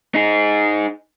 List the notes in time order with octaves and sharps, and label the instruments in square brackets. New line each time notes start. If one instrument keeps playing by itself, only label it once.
[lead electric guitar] D#4 G#4